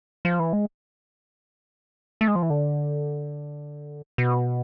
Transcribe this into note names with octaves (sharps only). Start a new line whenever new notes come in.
F3
E3
G#3
A3
G#3
F3
E3
D3
B2